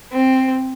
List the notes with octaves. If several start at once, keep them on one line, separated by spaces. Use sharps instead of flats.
C4